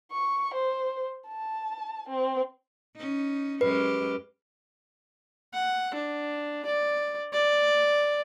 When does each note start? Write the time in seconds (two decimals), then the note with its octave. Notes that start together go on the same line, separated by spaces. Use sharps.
0.12 C#6
0.55 C5
1.28 A5
2.09 C4
2.96 C#4 D#4
3.61 F#2 G#3 G4 B4
5.54 F#5
5.94 D4
6.66 D5
7.33 D5